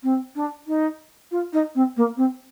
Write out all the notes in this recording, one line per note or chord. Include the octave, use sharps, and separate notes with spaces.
C4
D4
D#4
F4
D#4
C4
A#3
C4